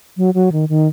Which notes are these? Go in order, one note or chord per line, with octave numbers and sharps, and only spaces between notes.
F#3
F#3
D#3
D#3